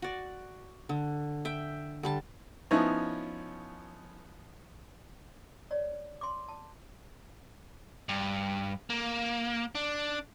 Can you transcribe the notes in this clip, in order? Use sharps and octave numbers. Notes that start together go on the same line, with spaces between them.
F#4 D5
D3
E5 G5
D3 G3 A5
F3 B3 C#4 D#4 E4 C#5
C#5 D5
C6 D6
A5
G2
A#3
D4